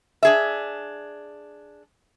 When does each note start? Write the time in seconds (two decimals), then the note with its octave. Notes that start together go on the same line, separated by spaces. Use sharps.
0.23 D4 G#4 E5